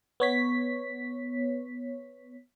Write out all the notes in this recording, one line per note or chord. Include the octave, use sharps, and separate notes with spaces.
B3 C#5 B6